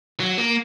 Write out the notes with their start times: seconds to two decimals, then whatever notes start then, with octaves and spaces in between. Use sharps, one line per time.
0.20 F#3
0.38 A#3